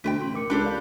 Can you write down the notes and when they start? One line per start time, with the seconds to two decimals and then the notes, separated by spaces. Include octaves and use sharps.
0.04 D2 B2 B4 G5 B6
0.22 A1 C6
0.34 A#4 D6 C#7
0.50 C#2 D4 G4 A4 B5
0.64 D5 F5 G6